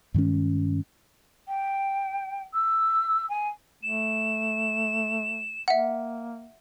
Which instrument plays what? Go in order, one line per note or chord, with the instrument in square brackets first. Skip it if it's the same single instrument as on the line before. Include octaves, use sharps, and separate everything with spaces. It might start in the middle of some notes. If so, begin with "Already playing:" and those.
[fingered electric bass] G2 D#3 G#3 C#4
[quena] G5
E6
G#5
[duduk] A3 [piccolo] E7
[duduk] A#3 [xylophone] E5 F#5